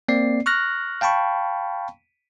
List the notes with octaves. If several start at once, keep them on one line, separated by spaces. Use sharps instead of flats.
A#3 C4 D5 C7
C#6 F6 F#6 A#6
F5 G5 A5 B5 C#6